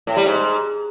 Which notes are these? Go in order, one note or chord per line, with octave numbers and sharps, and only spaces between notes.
A2
G3
G#2